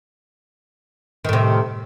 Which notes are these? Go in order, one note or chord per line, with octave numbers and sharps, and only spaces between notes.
A2 C3 D#3